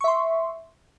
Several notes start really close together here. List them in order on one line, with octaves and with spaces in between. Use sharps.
C#6 E5 C6